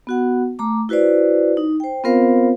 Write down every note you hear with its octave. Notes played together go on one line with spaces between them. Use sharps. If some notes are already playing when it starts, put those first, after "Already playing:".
B3 F#4 F#5
A3 A#5 D6
E4 F#4 B4 C5 D5
D#4
C5 G5
B3 C4 F4 A#4 C5 F5